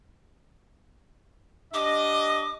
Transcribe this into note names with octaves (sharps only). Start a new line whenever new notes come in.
D4 G4 D#5 D6